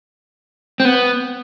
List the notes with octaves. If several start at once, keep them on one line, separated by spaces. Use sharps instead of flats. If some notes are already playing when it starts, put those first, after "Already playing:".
C4
B3